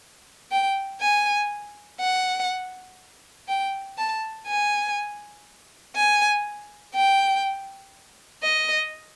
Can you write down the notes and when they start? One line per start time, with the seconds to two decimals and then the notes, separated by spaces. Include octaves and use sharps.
0.52 G5
1.01 G#5
2.00 F#5
3.48 G5
3.98 A5
4.47 G#5
5.96 G#5
6.95 G5
8.43 D#5